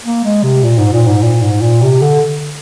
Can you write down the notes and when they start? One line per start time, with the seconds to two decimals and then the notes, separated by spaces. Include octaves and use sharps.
0.05 A#3
0.25 G#3
0.43 C3
0.63 A#2
0.78 G#2
0.93 A#2
1.07 G#2
1.23 A#2
1.42 G#2
1.62 A#2
1.82 C3
2.02 D3